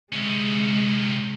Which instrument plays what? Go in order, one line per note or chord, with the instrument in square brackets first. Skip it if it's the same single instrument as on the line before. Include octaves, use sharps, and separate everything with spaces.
[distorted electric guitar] C3 C#4 [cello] G#3